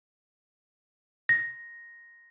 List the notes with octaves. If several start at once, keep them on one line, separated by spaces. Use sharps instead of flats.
A#6